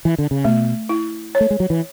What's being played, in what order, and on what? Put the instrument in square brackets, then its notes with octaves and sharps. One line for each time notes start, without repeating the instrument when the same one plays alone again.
[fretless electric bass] E3
D3
C#3
[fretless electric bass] B2 [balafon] A3
[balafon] E4
C#5
[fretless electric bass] A3
G#3
F#3
E3